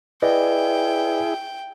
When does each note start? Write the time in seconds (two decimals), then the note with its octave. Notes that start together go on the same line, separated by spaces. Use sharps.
0.22 E4 G#4 B4 D5 D#5 G5